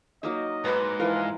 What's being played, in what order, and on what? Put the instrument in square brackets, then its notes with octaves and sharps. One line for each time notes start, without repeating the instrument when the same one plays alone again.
[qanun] F#3 A#3 D#4 [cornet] D#5
[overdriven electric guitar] G#2 [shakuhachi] B4 [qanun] A#5 D6
[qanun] E3 F3 A#4 [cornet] F5